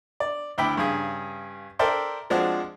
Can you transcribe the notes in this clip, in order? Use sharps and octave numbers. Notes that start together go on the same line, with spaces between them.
D5
D2 E4 G5 B5 D6
G2 C#3 G#4 D#6
A4 A#4 C5 D5 E5 G5
F3 G#3 C4 D4 F#4